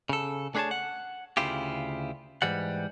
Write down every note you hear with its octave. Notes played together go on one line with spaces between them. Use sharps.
C#3 A4
A3 D4 G#4 B4 C#5 A5
F#5
D2 C#3 E4 F4 G4
G#2 E3 G3 F#5